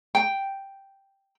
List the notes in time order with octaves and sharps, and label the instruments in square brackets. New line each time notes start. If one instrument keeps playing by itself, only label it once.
[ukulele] G5